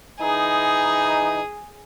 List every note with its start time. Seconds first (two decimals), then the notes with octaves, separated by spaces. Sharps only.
0.21 E3 D#4 G#4